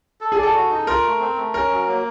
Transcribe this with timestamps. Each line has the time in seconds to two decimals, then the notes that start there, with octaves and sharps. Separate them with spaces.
0.21 A4
0.32 G#4
0.38 D5
0.43 A4
0.54 F#4
0.71 D#4
0.87 F4 A#4
1.04 A3
1.20 C4
1.37 A3
1.54 C#4 A#4
1.70 F#3
1.88 A#3